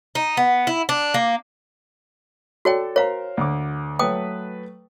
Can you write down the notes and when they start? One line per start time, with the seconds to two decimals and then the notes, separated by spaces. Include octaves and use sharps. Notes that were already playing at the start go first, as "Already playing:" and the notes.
0.15 D#4
0.37 B3
0.67 E4
0.89 D4
1.14 A#3
2.65 F#4 A4 C#5 D5 G5
2.96 A#4 C5 C#5 F5 A#5
3.37 D2 D6
3.99 F#3 A3 B4 G5 D#6